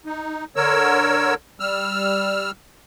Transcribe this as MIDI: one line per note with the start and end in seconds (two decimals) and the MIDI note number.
0.06 0.45 63
0.56 1.34 50
0.56 1.34 70
0.56 1.34 73
0.56 1.34 88
1.60 2.51 55
1.60 2.51 88
1.60 2.51 89